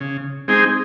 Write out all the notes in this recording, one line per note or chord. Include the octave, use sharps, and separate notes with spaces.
C#3
G#3 C4 D#4 G#4